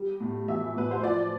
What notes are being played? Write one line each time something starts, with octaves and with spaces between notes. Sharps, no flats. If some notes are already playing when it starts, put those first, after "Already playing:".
Already playing: G3
A2
E3 E5
A2 B4
C5
F3 D5